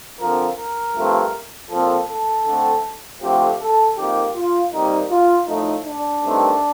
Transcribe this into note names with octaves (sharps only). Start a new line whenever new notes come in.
D3 F3 C4 A#4
A#4
G2 F3 A3 C4
A#2 F3 C4 A4
A4
D3 A3 C4
D3 F3 A3 C4 G4
A4
F2 D#3 A#3 G4
F4
C3 D#3 G3 A#3 D#4
F4
A2 F3 A3 D#4
D4
G2 D#3 A3 C4